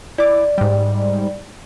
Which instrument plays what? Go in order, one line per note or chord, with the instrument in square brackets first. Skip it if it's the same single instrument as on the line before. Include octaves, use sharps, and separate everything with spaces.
[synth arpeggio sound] E4 D6 [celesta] D5
[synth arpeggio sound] G#2 G3